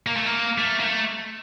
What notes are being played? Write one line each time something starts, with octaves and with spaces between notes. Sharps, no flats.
A#3
A3
A#3
A3
A#3
A3